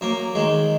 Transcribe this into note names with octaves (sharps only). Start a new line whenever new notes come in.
F#2 A#3
D#3 G#3